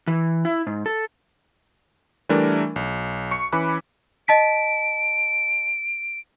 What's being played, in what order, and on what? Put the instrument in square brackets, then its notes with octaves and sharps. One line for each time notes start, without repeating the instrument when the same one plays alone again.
[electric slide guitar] E3
E4
G#2
A4
[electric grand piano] E3 G3 A3 D4 A#4
B1
C#6 C#7
E3 C#4 B5 D6 F#6
[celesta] D#5 A5 B6 [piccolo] D7